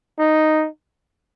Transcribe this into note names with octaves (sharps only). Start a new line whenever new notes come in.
D#4